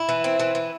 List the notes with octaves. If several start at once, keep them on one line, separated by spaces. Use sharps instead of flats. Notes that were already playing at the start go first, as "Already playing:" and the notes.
Already playing: E4
E3
C4
E3
E3